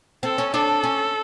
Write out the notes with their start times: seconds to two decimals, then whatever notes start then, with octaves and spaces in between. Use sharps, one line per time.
0.23 C4 A4
0.38 C#4
0.53 D4 A4
0.84 C#4